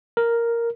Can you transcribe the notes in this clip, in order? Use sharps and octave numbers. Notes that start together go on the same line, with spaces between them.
A#4